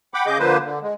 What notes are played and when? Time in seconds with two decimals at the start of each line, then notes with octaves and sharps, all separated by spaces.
0.14 F#5 G5 B5 D6
0.26 C#3 G#4 D#5 D6 G6
0.39 D3 F3 A#3 B4 C5
0.64 D3
0.82 G#3